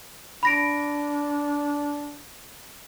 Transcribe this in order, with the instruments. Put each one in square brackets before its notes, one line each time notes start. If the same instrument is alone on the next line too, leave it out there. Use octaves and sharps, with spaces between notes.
[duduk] D4 [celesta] B5 A#6 D7